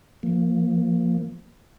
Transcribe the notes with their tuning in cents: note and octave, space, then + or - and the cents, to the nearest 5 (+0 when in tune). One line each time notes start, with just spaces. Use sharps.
F3 +0 A#3 +0